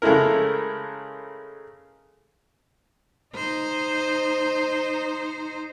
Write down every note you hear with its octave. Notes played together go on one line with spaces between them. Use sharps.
C#3 G#3 A3 E4 A#4
D#4 C5